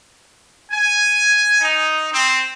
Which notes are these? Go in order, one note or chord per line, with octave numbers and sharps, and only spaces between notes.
G#5
D#4
C4